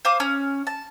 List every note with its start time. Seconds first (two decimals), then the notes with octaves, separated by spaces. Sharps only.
0.05 C5 F5 D6 D#6
0.20 C#4
0.67 A5